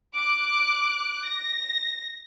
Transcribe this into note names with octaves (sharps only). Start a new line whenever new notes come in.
D6 F#6 D7
A#6